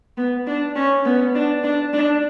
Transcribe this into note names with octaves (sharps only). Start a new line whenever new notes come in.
B3
D4
C#4
B3
D4
D4
D4